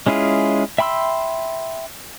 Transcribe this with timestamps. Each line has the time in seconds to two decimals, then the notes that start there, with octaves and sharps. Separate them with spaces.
0.07 G#3 C#4 E4 F4 G#4
0.78 E5 G5 B5 C6 E6